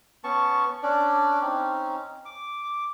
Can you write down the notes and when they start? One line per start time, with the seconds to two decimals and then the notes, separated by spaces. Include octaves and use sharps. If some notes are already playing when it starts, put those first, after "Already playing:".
0.24 B3 C#4 A5 C#6
0.83 C#4 D4 D5
1.41 C4 C#4 D#4
2.26 D6